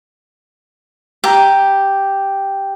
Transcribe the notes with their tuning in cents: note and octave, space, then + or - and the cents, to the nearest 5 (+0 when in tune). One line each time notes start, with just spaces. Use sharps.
G4 +0 A#5 +0